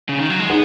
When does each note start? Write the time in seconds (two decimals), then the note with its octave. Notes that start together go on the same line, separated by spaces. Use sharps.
0.09 C#3
0.19 D#3
0.30 F#3
0.40 G#3
0.50 B3 D#4 G#4